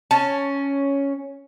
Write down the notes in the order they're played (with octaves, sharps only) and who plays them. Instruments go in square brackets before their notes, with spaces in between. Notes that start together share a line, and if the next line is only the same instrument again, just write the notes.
[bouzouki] C#4 [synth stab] A5